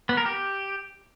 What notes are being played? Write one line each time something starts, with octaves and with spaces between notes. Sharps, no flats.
B3
A#4
G4